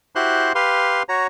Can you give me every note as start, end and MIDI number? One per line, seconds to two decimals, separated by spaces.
0.15 0.53 64
0.15 0.53 66
0.15 0.53 67
0.15 0.53 72
0.15 0.53 84
0.15 0.53 90
0.55 1.03 67
0.55 1.03 71
0.55 1.03 77
0.55 1.03 84
1.09 1.27 66
1.09 1.27 73
1.09 1.27 82